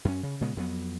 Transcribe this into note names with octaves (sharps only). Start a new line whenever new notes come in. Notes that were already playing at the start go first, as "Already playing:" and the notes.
F#2 C#4
C#3
A#2 C#3 G#3 B3
F2 F#3 B3